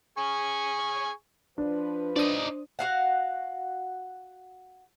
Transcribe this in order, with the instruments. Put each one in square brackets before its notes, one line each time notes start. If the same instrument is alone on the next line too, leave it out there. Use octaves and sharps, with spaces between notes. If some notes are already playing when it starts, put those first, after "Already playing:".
[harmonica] G#4 G#5 C#6
[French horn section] F3 B4 [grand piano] D4
[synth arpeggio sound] D4 D#6 [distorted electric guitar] D#4 D5 [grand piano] C5
[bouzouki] F#4 F5 F#5